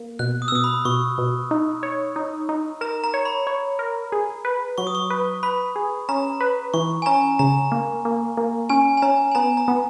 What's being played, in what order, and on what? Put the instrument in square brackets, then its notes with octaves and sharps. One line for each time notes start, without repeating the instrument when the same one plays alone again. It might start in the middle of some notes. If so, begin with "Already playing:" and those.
Already playing: [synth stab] A#3
[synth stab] B2 [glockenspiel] F#6
[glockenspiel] D#6
E6
[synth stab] B2 [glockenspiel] D#6
[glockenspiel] B5
[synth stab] B2 [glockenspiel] C#6
[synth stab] B2
D#4
C#5
D#4
D#4
[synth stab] A#4 [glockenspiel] A#5
[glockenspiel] A#5
[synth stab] C#5
[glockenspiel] B5
[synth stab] C#5
A#4
G#4
B4
[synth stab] F#3 [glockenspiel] C#6
[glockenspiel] D#6
C#6
[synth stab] B4
[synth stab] B4 [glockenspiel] B5
[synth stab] G#4
[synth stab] C#4 [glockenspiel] A#5
[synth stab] B4
[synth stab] E3 [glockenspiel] C#6
[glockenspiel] G#5
[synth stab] C#4 [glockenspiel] A#5
[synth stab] C#3 [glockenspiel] A#5
[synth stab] A#3
A#3
A#3
[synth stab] C#4 [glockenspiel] G#5
[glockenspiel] G#5
[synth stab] C#4 [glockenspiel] A#5
[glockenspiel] G#5
[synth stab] B3 [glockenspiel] A#5
[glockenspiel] A#5
[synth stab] B3